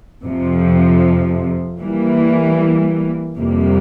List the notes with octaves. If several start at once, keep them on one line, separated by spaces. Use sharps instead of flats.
F2 C3 F3
E3 G3 A#3
F2 C3 G3 A#3